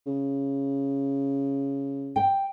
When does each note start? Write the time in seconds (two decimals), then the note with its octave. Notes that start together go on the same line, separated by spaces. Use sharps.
0.06 C#3
2.16 G5